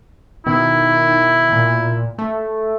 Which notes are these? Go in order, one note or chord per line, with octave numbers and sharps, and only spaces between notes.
B2 D#3 E4
A#2
A3